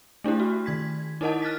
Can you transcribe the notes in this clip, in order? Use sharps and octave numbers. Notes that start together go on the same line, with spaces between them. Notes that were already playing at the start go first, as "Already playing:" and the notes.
A3 D4 E4 G4
F#4
D#3 G#6 B6
D#4 E4 A#4 D#5 F#5 A5
F6 F#6 A6 B6